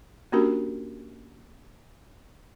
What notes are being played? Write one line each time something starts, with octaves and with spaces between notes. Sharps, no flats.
A#3 C#4 D4 F#4 G4 A#4